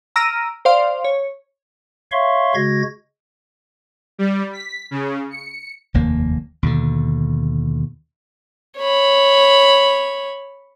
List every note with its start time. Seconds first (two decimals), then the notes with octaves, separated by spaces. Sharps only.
0.16 A#5 E6 F6 A#6 D7 D#7
0.65 C5 D5 F5 C6
1.04 C#5
2.12 C#5 E5 F5 C6 C#6
2.55 C#3 G#3 F#4 G#6 A#6
4.19 G3
4.53 B6
4.91 C#3
5.31 C#7
5.94 F1 D#2 A#3
6.63 D#2 B2 D3
8.79 C#5 B5